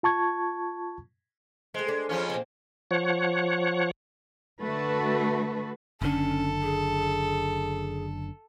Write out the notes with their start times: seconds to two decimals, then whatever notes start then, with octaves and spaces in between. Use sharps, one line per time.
0.03 F4 A5 C#6 G#6
1.74 G#3 A3 C4
1.88 D4
2.09 F2 F3 C#4
2.30 A#2 C4
2.91 F3 C#5 F#5
4.61 D3 A3 F#4 A4 B4
6.02 F#1 D3 C#4 A4
6.63 G#4